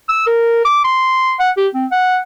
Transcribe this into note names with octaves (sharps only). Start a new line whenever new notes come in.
E6
A#4
D6
C6
F#5
G4
C4
F#5